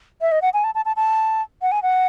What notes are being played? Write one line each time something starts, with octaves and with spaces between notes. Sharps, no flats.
E5
D#5
F#5
G#5
A5
A5
A5
A5
F#5
G#5
F#5